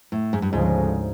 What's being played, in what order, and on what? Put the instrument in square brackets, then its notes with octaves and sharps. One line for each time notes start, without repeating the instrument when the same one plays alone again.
[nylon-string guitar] A2
G#2
G2
[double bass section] D2 C#3 F3 G#3 [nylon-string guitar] G#2